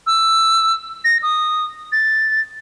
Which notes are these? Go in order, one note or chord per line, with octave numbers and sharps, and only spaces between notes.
E6
A#6
D#6
A6